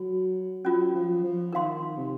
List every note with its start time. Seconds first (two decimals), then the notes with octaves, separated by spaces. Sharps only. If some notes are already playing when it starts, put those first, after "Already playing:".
Already playing: F#3 F#4
0.65 F#3 C#4 F4 A#4
0.94 F3
1.24 F3
1.53 D#3 A#4 F5 C6
1.97 C3